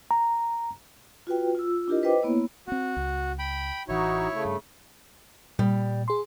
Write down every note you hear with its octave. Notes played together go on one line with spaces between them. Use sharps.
A#5
F4 F#4 B4 G5
F4 E6
D4 E4 F4 G4 A#4 D#5
B4 C5 D#5 G5 D6
A#3 B3 E4 C#5
B3 C4 F#4
C#2
G5 B5
A1 E3 D#4 E4 F#4 C#5
C#3 A3
G2
A#2 G3
G#4 C6